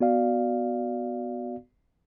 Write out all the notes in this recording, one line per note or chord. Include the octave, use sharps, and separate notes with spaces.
B3 F#4 D5 F5